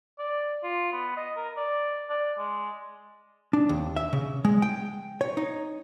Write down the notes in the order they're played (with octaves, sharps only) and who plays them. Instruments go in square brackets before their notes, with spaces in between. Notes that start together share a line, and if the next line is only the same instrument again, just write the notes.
[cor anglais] D5
F4
B3
D#5
A#4
D5
D5
G#3
[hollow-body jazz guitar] D4
D#2
E5
C#3
G#3
G5
C#5
D#4